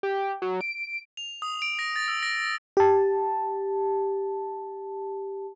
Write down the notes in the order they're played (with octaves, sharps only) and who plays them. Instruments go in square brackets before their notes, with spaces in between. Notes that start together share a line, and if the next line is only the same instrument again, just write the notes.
[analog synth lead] G4
F#3
D7
[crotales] F7
D#6
D7
A#6
A6
E6
A#6
[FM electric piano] G4 A5